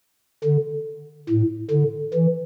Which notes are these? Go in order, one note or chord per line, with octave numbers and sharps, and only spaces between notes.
D3
A2
D3
E3